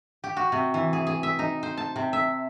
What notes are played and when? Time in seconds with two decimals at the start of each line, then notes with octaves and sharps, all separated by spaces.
0.24 G4
0.37 F#4
0.52 C3
0.74 E3
0.93 G#4
1.07 G#4
1.23 E5
1.39 D#4
1.63 C5
1.77 A5
1.96 C3
2.13 E5